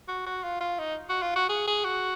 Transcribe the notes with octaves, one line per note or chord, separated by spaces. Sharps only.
F#4
F#4
F4
F4
D#4
F#4
F4
F#4
G#4
G#4
F#4